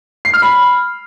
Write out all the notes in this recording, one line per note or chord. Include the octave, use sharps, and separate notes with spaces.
C7
F6
B5